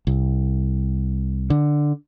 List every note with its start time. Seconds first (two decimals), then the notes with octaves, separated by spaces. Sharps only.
0.07 C2
1.50 D3